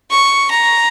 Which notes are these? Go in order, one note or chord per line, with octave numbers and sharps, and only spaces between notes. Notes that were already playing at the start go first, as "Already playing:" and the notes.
C#6
A#5